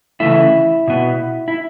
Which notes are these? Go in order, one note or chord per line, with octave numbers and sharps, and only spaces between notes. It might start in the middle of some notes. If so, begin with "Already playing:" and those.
C#3 E3 A3 E4
B2 B3
E4